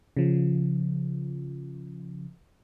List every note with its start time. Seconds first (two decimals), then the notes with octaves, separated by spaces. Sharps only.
0.17 C#3 F3